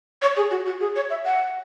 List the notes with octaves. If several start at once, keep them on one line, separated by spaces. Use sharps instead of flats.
C#5
G#4
F#4
F#4
G#4
C#5
E5
F#5